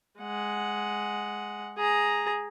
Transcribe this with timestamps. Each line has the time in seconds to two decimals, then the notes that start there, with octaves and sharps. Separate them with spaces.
0.19 G#3 F#5
1.77 G#4 A#5